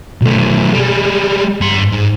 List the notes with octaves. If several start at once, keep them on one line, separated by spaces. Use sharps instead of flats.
B1 A3
G3 G#3
G2 C6
G#2